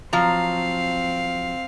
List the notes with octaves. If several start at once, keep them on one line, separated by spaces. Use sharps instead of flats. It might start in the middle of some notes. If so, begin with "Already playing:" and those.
F3 F#3 C4 F5 A#5